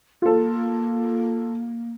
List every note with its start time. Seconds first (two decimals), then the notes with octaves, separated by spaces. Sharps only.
0.22 A#3 F4 A4